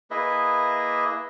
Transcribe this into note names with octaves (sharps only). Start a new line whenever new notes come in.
A#3 E4 G#4 B4 D#5 E5